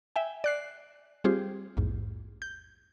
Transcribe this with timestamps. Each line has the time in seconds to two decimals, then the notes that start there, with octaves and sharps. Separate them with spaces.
0.16 E5 G5 G#5
0.44 D5 F#6 C7
1.24 G3 C4 F4 G4 G#4 C5
1.77 A#1 E2 G#2
2.42 G6